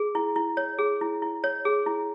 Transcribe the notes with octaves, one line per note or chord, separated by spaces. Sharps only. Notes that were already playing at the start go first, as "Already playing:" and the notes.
Already playing: G#4
E4
E4
C#5
G#4
E4
E4
C#5
G#4
E4